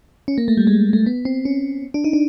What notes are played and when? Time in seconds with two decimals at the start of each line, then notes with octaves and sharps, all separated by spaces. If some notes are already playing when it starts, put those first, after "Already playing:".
0.28 C#4
0.38 A#3
0.48 A3
0.57 G3
0.67 G#3
0.93 A3
1.06 B3
1.25 C4
1.45 C#4
1.94 D4
2.04 D#4
2.13 D4